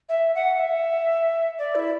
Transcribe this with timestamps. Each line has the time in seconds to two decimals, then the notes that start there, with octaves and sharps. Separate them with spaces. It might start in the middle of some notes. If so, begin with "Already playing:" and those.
0.09 E5
0.35 F#5
0.59 E5
1.58 D5
1.75 E4